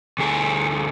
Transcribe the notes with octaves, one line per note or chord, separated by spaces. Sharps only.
D2 G#4